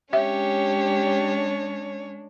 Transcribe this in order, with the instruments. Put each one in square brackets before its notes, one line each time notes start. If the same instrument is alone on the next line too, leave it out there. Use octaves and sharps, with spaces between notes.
[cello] G#3 D4 [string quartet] C#4 C#5 [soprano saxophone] G4 [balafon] E5